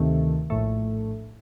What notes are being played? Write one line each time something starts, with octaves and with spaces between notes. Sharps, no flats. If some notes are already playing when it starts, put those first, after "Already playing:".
Already playing: D2 C3 D#3 A3
A#1 A2 A3